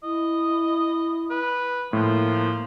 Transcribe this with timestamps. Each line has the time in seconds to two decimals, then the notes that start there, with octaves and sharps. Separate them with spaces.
0.03 E4 D#5
1.30 B4
1.93 A2 F3 A#3